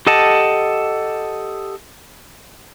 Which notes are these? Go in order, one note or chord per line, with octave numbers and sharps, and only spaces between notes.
G4 A4 D#5 F#5 A5